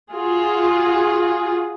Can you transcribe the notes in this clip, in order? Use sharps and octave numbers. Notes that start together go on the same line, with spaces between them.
F4 F#4 G#4